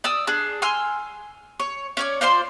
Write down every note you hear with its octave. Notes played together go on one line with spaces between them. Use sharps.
D5 D#6 E6
D4 G#4
G#5 C6 E6 F6
C#5
C#4 C#5 D5
F4 C5 D5 C6